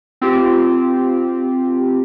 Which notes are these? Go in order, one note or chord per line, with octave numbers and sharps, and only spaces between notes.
C4 F4 G4